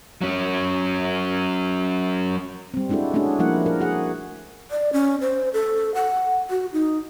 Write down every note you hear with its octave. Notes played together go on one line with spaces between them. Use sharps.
F#3 C#4
G3 C4
G#3 D4 E4 F#4 A4
A3 C#4 D4 F#4 G#4
F3 G3 A#3 E4 A#4 F#5
A#4
F#4 G#4 F#5
D5
C#4
C5
A4
F#5
F#4
D#4